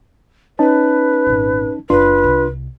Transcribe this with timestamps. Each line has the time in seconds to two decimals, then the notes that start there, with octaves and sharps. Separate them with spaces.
0.59 C#4 D#4 B4 A5
1.26 G#1 A#2
1.90 F#1 D4 F4 B4 C6
2.24 C2